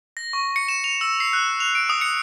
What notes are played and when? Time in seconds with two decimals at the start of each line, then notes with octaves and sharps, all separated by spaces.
0.17 A#6
0.33 C#6
0.56 C#7
0.68 E7
0.84 F7
1.01 E6
1.20 C7
1.33 F#6
1.60 F7
1.75 D7
1.89 D#6
2.01 C#7